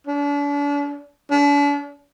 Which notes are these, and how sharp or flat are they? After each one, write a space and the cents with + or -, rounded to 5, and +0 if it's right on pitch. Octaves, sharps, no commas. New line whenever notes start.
D4 -40
D4 -40